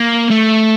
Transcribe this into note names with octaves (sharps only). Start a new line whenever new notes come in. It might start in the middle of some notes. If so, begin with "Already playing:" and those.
Already playing: A#3
A3